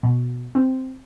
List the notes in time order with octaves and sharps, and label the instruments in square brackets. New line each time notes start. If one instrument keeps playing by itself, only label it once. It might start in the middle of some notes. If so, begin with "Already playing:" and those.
[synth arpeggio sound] B2
C4